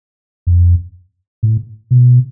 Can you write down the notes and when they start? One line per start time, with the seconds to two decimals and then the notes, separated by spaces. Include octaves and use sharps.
0.47 F2
1.43 A2
1.91 B2